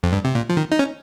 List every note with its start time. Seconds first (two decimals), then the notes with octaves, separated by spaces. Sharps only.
0.03 F2
0.13 G2
0.25 C3
0.35 A#2
0.49 F3
0.57 D#3
0.72 D#4
0.79 C#4